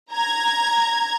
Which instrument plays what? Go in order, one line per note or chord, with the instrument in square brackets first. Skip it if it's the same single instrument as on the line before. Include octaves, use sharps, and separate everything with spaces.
[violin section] A#5 G#6